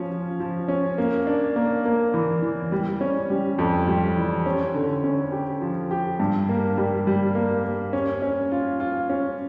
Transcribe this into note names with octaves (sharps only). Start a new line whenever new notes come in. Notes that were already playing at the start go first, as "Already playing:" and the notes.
Already playing: F3 C#4
F3
F3
C#4
A#3
D4
A#3
A#3
E3
E3
G3
C#4
G3
F2
G3
E3
C#4
D3
C#4
G4
F3
G4
G2
A#3
G3
G3
A#3
A#3
C#4
C#4
F4
F4
C#4